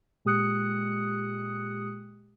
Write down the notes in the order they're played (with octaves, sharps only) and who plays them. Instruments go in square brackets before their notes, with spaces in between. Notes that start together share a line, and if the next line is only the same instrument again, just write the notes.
[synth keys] A#2 G#3 G4 D#6 F#6 C#7